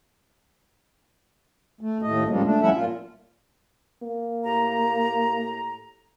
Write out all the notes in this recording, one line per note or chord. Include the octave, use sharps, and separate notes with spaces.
A3
D#2 A2 A3 D#5
G#2 C#3 F3 G3 G#3 A#3
A3 D4
F3 G3 C#4 E4 E5 F#5
A#2 F4
A#3
A2 G4 A#5